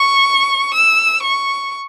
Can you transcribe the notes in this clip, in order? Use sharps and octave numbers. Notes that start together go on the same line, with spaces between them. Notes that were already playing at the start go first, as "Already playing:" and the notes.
Already playing: C#6
E6
C#6